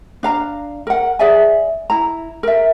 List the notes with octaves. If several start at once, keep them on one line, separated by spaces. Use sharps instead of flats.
D4 F5 A#5
A#4 F#5
G#4 D5 E5 G#5
E4 A#5
A#4 E5